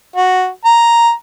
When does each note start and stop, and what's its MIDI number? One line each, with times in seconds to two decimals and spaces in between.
0.16 0.47 66
0.65 1.11 82